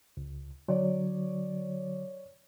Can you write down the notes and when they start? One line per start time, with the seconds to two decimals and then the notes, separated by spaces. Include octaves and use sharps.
0.17 C#2
0.68 D3 F#3 C#5 D5